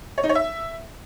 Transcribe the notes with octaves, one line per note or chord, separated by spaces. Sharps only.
C#5
D#4
C#5
E5